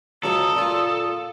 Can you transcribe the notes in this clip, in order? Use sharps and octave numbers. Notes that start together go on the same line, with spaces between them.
C#2 F#3 A4 C#6 D#6
A#2 F4